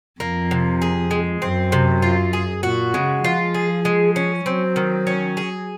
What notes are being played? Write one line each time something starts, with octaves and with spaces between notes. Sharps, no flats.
F2 A#3
C3
G#4
G#3
F#2 C4
C3
F4
G#4
A#2 F#4
C#3 G#3
F3 F4
G#4
G#3
C#4
F#3 C4
D#3
C#4
G#4